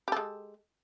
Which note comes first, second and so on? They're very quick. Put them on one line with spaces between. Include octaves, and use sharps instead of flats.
G4 A4 G#3